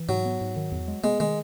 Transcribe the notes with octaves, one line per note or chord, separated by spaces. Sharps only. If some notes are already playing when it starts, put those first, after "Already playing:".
Already playing: E3
G#2 F#3
B3
G#2
D#3
E2
G#3
G#3 B3
D#3 G#3